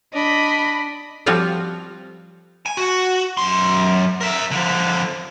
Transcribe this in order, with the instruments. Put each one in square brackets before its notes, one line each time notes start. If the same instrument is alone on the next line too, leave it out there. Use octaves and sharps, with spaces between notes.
[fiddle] D4 [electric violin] D#5 B5
[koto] F3 G3 C4 F4 F#4
[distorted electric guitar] G#5
F#4
F#2 C6
A#4 E5
D3 F3